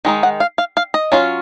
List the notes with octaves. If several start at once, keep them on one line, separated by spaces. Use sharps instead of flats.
D#3 G#3 D#4
F#5
F5
F5
F5
D#5
F#3 C#4 F4